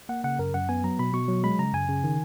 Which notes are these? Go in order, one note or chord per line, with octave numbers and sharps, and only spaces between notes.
A#3 F#5
C#3 F#5
F#2 A#4
F#2 F#5
B3 G#5
F#3 A#5
B2 B5
B2 C#6
F#3
G#3 B5
C#3 A#5
F#2 G#5
C#3
D#3